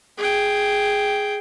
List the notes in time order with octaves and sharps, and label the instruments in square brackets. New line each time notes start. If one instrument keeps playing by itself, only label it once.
[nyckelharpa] G#4 G5